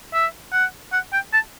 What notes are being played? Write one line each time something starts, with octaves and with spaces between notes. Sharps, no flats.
E5
F#5
F#5
G5
A5